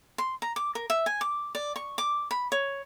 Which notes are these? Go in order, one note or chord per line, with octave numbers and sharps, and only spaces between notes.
C6
A#5
D6
A#4
E5
G#5
D6
D5
C#6
D6
B5
C#5